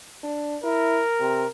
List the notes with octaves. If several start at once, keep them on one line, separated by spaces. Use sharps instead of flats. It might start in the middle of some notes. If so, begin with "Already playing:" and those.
D4
E4 A#4
C3